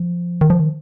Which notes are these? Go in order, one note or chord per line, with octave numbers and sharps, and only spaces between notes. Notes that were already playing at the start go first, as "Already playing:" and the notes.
Already playing: F3
D#3
F3
D#3